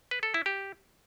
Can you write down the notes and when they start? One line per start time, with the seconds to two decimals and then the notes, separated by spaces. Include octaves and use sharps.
0.11 B4
0.23 A4
0.34 E4
0.46 G4